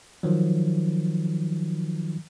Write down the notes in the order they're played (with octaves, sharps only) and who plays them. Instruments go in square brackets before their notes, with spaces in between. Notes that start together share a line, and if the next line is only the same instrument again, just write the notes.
[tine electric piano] D#3 F3 F#3